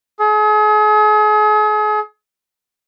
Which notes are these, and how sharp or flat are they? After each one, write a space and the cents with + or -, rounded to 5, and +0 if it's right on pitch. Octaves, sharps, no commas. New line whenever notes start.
G#4 +40